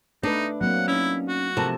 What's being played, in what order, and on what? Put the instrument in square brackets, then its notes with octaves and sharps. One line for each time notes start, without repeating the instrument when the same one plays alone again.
[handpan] A3 B4 [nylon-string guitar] D4 [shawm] D#4
[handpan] F#3 A#3 C4 [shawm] F#5
[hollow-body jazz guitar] C#4 D#4 [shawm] E4
[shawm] F#4
[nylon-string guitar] C3 A5 [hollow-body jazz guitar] F3 A3 A#4